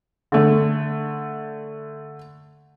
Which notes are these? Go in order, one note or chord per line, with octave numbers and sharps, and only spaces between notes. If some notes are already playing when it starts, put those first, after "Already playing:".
D3 A3